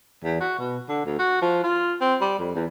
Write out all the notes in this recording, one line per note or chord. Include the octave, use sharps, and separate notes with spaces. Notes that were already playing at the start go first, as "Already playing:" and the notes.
E2
F#4
B2
D3
D2
F#4
F3
F4
C4
G3
F2
E2